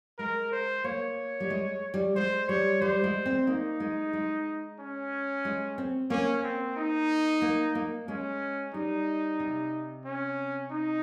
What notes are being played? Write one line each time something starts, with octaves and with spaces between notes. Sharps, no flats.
G#3 A#4
C5
A#3 C#5
G3
G#3
G3
G#3 C5
G3 C#5
G3 C5
G#3
C4
A#3 D#4
G#3
G#3
C#4
G#3
C4
A#3 C#4
C4
D#4
A#3
A#3
G#3 C#4
G3 D#4
C3
C#4
D#4